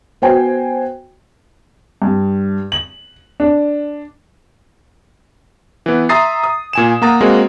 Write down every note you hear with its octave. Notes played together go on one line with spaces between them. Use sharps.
B3 F#4 C5 G5 G#5
G2
F#7
D4
E3 B3
E5 A#5 C6 D#6 A6 C7
D#6
A#2 G#5 E7
A#3 F#5 A#5 D#6 A6
G#3 A#3 C4 F#4 A#4